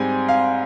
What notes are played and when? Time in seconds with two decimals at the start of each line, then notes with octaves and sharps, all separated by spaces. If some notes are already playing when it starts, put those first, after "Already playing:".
Already playing: G#2 G3 C4 G#5
0.28 F5